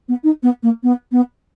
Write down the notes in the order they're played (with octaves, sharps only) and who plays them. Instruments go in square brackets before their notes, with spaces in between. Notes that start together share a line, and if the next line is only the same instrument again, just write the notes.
[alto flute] B3
D#4
B3
A#3
B3
B3